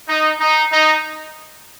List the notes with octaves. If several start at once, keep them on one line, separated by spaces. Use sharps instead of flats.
D#4
D#4
D#4